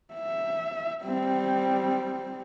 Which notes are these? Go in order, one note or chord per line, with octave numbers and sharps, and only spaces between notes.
E5
G3 C4